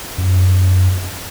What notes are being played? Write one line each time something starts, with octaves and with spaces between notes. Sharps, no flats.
F#2